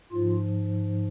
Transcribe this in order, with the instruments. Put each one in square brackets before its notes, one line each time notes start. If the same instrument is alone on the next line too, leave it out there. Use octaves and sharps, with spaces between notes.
[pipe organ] G#2 F3 F4